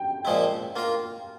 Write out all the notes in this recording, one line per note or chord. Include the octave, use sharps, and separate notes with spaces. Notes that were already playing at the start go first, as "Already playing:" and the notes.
Already playing: G5
A#2 F3 G#3 E4
A#3 F4 A#4